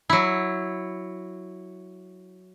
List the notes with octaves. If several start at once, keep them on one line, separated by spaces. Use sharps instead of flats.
F#3 E4